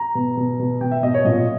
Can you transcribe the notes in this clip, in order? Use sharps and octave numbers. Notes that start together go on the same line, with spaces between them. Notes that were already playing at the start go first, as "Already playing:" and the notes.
Already playing: A#5
B2
B2
B2
B2 G5
E5
B2 D#5
C#5
A#2 D#5